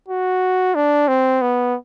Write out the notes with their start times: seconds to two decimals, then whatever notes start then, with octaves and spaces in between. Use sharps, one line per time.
0.09 F#4
0.75 D4
1.08 C4
1.42 B3